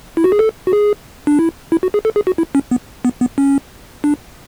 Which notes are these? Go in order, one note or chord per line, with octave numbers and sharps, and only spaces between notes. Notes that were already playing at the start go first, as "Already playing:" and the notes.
E4
F#4
G#4
A4
F#4
G#4
D4
E4
E4
F#4
G#4
A4
G#4
F#4
E4
C#4
B3
B3
B3
C#4
D4